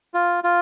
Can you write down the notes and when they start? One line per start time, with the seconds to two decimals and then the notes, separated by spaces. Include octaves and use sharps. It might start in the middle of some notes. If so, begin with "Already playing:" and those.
0.14 F4
0.44 F4